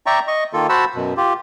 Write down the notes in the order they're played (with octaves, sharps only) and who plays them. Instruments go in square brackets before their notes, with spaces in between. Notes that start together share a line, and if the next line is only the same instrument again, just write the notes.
[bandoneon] D5 E5 G5 A#5 C#6
D#5 C#6
D#3 A#3 F4 A4
F#4 C5 F#5 A5 B5 E6
F#2 B2
F4 G4